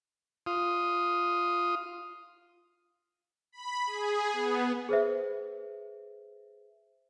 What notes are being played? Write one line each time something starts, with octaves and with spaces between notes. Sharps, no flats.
F4 D#6
B5
G#4
B3
G#4 B4 C5 E5